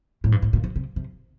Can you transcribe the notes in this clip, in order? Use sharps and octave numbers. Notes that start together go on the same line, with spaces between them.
A2
G2
A2
A#2
C3
C3
C3